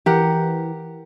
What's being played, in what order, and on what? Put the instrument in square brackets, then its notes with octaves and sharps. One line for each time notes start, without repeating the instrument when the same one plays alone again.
[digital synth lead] E3 [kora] G4 A#4 F#5